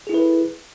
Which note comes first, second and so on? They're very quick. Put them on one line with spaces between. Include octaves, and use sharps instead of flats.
G#4 E4 A4 B4